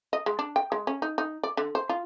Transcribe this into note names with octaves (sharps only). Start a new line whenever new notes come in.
D#5
G#3
D4
G5
G#3
C#4
D#4
D#4
D5
D3
C5
F4